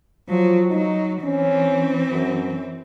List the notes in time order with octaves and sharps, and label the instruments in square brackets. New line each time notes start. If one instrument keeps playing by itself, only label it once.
[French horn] F3 [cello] F#3
[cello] F#3 [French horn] D#4
[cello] E3 C4 [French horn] C#4
[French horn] F#2